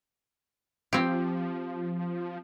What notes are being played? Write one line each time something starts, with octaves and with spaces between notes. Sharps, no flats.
F3 C4 G4